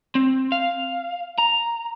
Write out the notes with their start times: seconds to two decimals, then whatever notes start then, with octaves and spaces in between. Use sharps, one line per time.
0.15 C4
0.52 F5
1.38 A#5